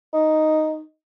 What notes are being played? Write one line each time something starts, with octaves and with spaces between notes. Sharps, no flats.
D#4